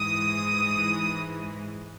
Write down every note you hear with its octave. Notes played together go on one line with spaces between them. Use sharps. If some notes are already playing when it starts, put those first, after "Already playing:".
Already playing: G#2 E3 G#3 D#6